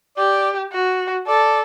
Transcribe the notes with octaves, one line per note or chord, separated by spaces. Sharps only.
G4 D5
F#4
A4 D5